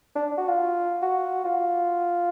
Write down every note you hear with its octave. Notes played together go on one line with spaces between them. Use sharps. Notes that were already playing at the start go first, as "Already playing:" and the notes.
D4
F#4
F4
F#4
F4